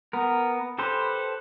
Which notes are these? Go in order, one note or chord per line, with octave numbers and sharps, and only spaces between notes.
B3 A#4
G4 A4 B4 C5